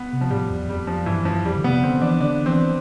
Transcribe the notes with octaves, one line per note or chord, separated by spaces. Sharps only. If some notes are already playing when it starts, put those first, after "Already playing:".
Already playing: B3
C3
F3
A2 G3
E2
F2 G3
F3
G2 E3
F3
F2 G3
D3
C3 B3
D3 C4
E3 D4
D3 D4
E3 C4